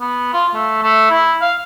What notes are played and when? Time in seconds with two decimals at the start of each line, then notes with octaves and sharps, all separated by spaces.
0.01 B3
0.33 F4
0.54 A3
0.83 A3
1.10 E4
1.41 F5